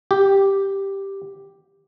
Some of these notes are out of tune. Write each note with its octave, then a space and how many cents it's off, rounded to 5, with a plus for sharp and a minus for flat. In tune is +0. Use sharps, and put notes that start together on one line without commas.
G4 +0